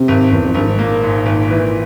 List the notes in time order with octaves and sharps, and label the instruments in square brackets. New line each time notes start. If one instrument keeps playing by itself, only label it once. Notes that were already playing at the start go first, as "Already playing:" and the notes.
Already playing: [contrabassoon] C3
[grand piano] G#1
[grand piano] G#1 [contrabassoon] E2
[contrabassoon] F2
[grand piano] G#1 [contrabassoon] G2
[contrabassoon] G#2
[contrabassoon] A#2 [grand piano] A#3
[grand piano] G#2
G#1
E3